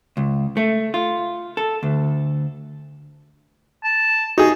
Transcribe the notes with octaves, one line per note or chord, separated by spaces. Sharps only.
C#2
A3
F4
A4
D2
A5
D#4 F#4 G#4